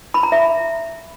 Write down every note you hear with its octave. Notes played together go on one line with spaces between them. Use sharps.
B5
A#5
E5